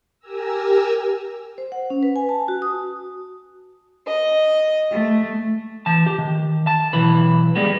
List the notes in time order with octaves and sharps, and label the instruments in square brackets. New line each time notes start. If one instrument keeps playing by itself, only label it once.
[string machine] G4 A#4 G#5 A#5 E6
[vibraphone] C5
F#5
C#4
B4
G#5
A5
F#4
D#6
[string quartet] D#5
A3
[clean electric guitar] E3 A5
G4
D#3
A5
B1 E3 B4
G3 G#3 B3